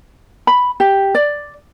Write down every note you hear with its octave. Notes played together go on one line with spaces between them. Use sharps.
B5
G4
D5